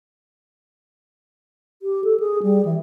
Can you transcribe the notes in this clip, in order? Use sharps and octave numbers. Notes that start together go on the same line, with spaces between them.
G4
A4
G#4
G3
E3